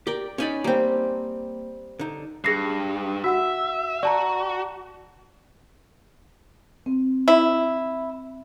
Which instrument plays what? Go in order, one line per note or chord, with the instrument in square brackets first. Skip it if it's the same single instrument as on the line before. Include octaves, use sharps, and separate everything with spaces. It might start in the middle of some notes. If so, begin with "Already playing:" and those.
[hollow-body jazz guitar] G4 A#4 [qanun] D5 G5
[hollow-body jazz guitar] C#4 D#4 D5 [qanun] C#5 G#5 B5
[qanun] G3 C4 [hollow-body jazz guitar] A#3 G5
[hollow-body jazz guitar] D3 D#4
[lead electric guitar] G2 [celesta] G#4 A#6 C7
[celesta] F#4 F#5 E6 [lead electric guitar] E5
[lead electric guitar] F#4 [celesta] D5 A5 A#5
[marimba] C4
[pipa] E4